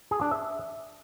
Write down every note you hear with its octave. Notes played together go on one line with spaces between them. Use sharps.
G#4
D4
E5